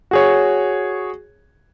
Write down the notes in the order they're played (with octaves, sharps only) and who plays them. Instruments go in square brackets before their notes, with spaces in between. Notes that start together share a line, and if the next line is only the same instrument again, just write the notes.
[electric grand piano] F#4 G#4 C#5